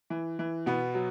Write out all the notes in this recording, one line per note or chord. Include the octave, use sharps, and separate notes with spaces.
E3
E3
B2 B3
F#3